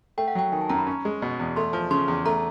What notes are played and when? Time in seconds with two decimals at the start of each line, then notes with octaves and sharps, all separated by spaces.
0.18 A3 G5
0.28 F#5
0.35 F#3 G5
0.52 D#3 G#5
0.61 A5
0.69 F#2 A#5
0.78 B5
0.87 C#4
1.05 G#3
1.22 B2
1.40 E2
1.56 A3 C6
1.73 F3
1.91 C#3 C6
2.08 E2
2.26 A3 A#5